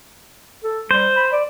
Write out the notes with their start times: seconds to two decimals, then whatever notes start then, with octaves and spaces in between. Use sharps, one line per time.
0.64 A4
0.91 G3 C5
1.16 B5
1.32 D5